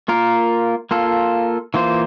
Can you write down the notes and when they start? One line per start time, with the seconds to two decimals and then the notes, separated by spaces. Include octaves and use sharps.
0.08 A#3 F4 A#4
0.91 A#3 F4 A4
1.74 E3 A#3 F4 C5